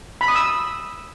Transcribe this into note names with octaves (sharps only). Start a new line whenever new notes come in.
B5
D#6
E6